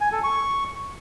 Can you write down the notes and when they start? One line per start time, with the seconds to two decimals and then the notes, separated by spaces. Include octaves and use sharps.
0.01 G#5
0.12 A4
0.23 C#6